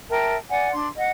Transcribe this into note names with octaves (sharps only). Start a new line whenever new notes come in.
A#4 E5 G5 A5
D5 F#5 G#5
D4 C6
D#5 F#5